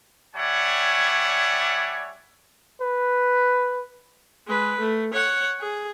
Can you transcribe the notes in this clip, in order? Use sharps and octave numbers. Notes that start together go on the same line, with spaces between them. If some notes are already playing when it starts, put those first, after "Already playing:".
G3 C#5 D5 E5 F#5 G#5
B4
G#3 B4
A3
C#5 F#5
G#4